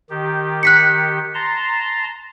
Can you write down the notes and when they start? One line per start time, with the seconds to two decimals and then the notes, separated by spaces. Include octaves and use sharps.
0.10 D#3 G4
0.63 F#6 B6 C#7
1.34 A5 A#5 C6